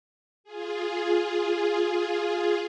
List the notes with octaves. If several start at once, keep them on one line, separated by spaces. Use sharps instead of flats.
F4 G#4